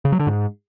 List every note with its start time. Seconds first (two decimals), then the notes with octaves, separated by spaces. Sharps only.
0.05 C#3
0.12 F#3
0.20 D3
0.27 G#2